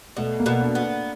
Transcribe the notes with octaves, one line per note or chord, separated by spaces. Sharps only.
B2 A3
A#3
B2
D4
B3